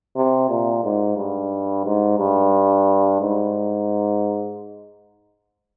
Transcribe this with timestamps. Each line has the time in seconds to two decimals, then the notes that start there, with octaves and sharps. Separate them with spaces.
0.16 C3
0.49 A#2
0.84 G#2
1.17 G2
1.85 G#2
2.19 G2
3.21 G#2